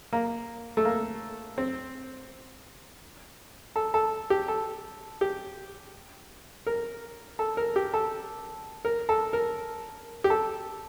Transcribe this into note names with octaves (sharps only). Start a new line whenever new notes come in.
A#3
A3
A#3
C4
A4
A4
G4
A4
G4
A#4
A4
A#4
G4
A4
A#4
A4
A#4
G4
A4